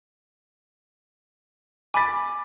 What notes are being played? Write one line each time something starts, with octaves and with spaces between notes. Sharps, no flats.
G#5 B5 D6 A6 B6